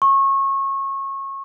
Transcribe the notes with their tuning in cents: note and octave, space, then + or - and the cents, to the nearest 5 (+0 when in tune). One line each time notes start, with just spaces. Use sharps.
C#6 -25